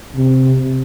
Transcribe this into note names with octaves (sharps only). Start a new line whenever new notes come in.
C3